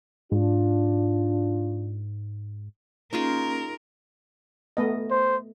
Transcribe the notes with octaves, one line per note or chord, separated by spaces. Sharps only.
G#2 D4 F4
A#3 C#4 D#4 F4 G#4 A#4 C6
A3 B3 D#5
C5